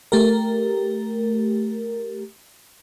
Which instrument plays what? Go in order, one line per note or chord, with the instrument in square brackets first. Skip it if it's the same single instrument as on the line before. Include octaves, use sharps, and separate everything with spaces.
[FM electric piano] A3 G4 A#4